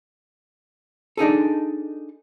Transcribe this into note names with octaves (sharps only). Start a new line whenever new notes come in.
D4 D#4 G#4 A4